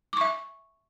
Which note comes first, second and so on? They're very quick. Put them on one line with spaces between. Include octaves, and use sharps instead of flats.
D6 C#6 E5